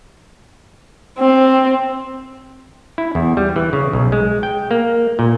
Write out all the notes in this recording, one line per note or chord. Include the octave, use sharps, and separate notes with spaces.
C4
E4
E2
G3
E3
C#3
B1
G#3
G5
A#3
A#2